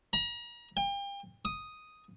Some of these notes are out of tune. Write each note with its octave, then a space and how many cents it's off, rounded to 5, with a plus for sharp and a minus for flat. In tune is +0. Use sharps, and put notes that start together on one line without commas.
A#5 +35
G5 +35
D#6 +0